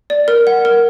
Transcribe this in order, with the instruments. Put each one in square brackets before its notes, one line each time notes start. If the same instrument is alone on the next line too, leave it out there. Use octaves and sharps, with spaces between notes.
[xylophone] D5
A#4
F#5
A#4